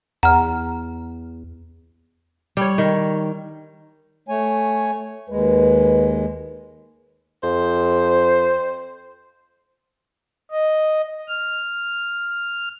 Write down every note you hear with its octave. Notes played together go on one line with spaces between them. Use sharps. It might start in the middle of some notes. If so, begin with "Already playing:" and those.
E2 F#5 A#5 F6
G3 C#5
D#3
A3 C#5 G#5
D#2 G#3 B4
F2 C5
D#5
F6